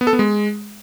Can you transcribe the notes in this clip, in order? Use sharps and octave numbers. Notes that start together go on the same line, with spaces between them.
B3
A4
B3
G#3